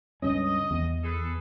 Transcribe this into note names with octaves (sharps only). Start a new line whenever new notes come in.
C#2 G2 C#4 D#5
E2
G#4 A4 B4